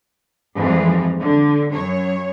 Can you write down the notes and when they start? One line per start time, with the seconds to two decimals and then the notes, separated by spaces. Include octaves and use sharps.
0.56 F2 G#2 E3 F3 G3
1.19 D3
1.73 F#2 C#5